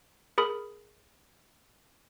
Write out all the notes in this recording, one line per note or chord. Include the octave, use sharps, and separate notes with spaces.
G#4 A#4 B5 D#6